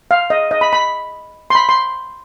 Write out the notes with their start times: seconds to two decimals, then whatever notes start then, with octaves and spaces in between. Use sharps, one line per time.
0.11 F5
0.30 D#5
0.51 D#5
0.61 B5
0.73 B5
1.50 C6
1.55 B5
1.69 C6